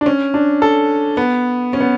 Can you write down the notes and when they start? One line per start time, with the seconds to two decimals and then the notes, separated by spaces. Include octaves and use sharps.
0.01 D4
0.06 C#4
0.34 D4
0.62 A4
1.17 B3
1.73 C#4
1.80 B3